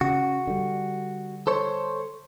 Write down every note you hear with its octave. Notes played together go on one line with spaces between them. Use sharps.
C#3 F#4
D3 G3
A4 C5 C#5